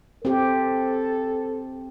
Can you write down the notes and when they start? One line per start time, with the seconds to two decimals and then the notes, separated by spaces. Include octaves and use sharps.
0.25 C4 G4 A4